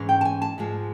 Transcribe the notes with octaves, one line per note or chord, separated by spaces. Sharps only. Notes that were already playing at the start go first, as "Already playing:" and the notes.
Already playing: G#2 E3 G#3 C#4
G5
A5
G#5
A5
G#2 F3 G#3